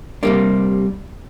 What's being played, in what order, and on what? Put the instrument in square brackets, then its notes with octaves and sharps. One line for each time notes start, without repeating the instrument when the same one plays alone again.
[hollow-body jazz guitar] C3 G3 A#3 D4